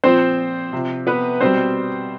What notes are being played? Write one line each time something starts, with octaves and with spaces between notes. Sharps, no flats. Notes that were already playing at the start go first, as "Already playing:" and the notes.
A#2 F3 C4 C5
C3 F3
B3 B4
B2 G3 C4 C5